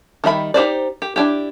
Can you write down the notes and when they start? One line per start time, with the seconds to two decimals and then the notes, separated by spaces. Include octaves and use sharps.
0.24 D#3 G3 E5 B5
0.54 D#4 G4 C5 D5
1.02 G4
1.16 D4 E4 G4